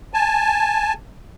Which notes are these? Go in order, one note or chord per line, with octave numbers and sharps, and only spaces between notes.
G#5 A5